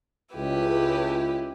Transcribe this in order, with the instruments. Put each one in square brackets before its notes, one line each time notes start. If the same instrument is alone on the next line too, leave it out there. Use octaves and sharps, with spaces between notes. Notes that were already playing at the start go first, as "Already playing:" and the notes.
[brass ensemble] C#2 [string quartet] E4 G4 B4